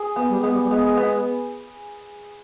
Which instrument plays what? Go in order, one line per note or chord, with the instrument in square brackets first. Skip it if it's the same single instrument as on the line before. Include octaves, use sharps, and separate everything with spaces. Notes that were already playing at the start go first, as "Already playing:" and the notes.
Already playing: [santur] G#4
B3
[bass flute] G3
[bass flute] G#3 [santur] B3
[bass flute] G3
G3
[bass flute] G#3 [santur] B3
[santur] B3